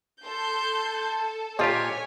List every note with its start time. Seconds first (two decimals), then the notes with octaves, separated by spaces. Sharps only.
0.24 A4 C6 G6
1.59 A#2 F4 G4 C5 C#5 D#5 G#5 A5